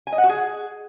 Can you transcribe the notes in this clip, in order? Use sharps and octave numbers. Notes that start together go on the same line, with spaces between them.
G#5
D#5
F#5
F#4
G#4